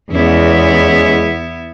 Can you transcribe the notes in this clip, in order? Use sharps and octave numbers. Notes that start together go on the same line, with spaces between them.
E2 G#3 B3 C#4 E4